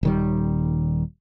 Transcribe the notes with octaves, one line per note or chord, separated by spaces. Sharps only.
D#1 D#3 G3